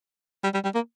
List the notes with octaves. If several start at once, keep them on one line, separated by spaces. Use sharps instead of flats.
G3
G3
G3
A#3